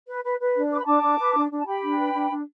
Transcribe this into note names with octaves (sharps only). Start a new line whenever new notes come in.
B4
B4
B4
D4
B4 D6
B5
D4 A5 D6
D4
B4
D4
D4
A5
G4 G5 B5
D4
B4
D4
D4